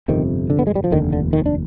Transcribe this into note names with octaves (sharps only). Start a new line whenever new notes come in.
G1 F2 C3 D#3
D3
B3
G#3
G3
F3
F1 D#2 D3 D#3
D3
D#3
D4